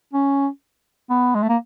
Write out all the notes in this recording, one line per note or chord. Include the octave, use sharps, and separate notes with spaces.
C#4
B3
G#3
A3
A#3